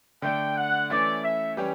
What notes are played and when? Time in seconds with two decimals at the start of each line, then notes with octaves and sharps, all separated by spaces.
0.22 D3 A3 D4 G5
0.56 F#5
0.90 E3 A3 C#4 E4 D5
1.23 E5
1.57 E3 G3 C#4 G4